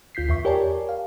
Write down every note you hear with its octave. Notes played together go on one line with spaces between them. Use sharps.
D2 F4 G6 B6 C7
E2 E5 C#6
G4 A#4 C#5 D5 G#5 A5
F5